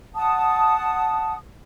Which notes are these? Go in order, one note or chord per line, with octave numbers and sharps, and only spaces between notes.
F#5 A5 D#6